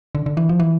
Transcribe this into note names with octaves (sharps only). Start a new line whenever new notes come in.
D3
D3
E3
F3
E3